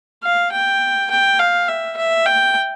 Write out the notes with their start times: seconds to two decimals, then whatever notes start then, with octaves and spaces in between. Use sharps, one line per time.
0.23 F5
0.52 G5
1.11 G5
1.39 F5
1.68 E5
1.97 E5
2.26 G5